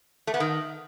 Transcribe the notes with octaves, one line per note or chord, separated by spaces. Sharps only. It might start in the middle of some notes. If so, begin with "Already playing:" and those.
A3
B3
D#3